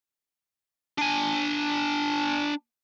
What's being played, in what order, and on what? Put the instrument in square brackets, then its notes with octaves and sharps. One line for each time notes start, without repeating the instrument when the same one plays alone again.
[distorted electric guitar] D4 G#5